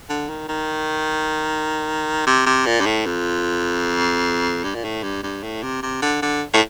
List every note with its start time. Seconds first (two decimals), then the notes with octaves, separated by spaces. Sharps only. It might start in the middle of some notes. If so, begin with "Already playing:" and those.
0.09 D3
0.29 D#3
0.49 D#3
2.27 C3
2.46 C3
2.66 A#2
2.80 G2
2.86 A2
3.06 F2
4.64 G2
4.75 A#2
4.84 A2
5.03 G2
5.23 G2
5.43 A2
5.62 C3
5.82 C3
6.02 D3
6.22 D3
6.53 A2